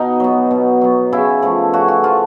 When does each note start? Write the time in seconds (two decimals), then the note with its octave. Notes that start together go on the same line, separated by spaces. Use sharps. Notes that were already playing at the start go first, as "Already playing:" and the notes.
Already playing: B2 D#4
0.20 F#3 B3
0.51 B2
0.81 F#3 B3
1.13 C#3 E4
1.42 F3 A3
1.73 C#3 F#4
1.88 F#4
2.03 F3 A3 F4